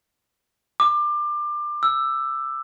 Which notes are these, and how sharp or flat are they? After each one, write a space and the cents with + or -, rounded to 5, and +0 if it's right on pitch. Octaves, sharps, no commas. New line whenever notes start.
D6 +25
E6 +10